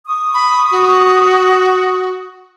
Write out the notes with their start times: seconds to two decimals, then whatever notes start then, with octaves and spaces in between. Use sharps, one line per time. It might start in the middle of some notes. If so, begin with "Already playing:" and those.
0.07 C#6 D#6
0.34 B5
0.72 F#4